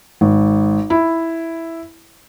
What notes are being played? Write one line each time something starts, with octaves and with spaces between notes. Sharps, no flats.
G#1
E4